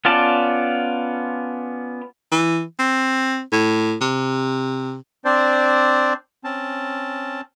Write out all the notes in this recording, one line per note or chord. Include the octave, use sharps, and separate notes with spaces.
B3 C#4 F4 D5 A5
E3
C4
A2
C3
C4 D4 C5 D5
C4 C#4 A5